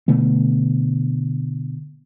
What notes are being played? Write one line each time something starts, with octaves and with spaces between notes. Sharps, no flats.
B2 D3 A3 B3